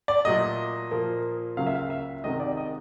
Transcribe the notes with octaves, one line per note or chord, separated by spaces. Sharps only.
D5
A#2 F#3 A3 D#5
A#2 F3 A#3
C#2 C#3 F#3 A#3 F5
E5
F5
E5
C2 C3 D#3 G#3 D#5
D5
D#5